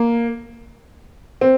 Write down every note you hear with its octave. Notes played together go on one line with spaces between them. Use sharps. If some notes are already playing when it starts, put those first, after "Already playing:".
Already playing: A#3
C4